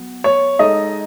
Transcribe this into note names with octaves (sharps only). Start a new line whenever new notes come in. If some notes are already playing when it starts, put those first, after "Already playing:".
Already playing: F#3 B3
C#5
G#3 D#4 A4 D#5